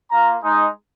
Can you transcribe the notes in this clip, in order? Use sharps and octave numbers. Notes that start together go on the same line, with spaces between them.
A#3 F4 A#4 A#5
G#3 D#4